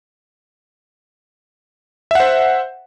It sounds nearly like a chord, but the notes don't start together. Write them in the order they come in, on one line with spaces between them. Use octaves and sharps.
E5 F#5 C5